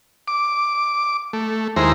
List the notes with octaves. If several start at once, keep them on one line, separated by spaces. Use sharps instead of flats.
D6
A3
D#2 G#3 E4 C5 A#5